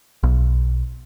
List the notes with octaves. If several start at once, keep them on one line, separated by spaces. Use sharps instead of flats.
B1